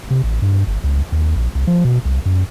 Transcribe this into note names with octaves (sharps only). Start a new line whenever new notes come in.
C3
A1
G2
G1
C#2
D#2
A#1
C2
F3
B2
C2
F#2